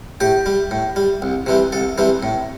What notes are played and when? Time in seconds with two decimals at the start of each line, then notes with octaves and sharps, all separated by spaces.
0.20 A2 G4
0.46 G3
0.71 A2
0.96 G3
1.22 C2
1.46 C3 E3 G3
1.72 C2 A4
1.98 C3 E3 G3
2.23 A2